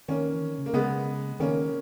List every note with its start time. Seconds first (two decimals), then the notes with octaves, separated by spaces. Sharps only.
0.08 D#3 A#3 C#4
0.34 E3
0.41 D#3
0.58 C#3
0.66 A#3
0.74 C#3 G#3 B3
1.40 D#3 A#3 C#4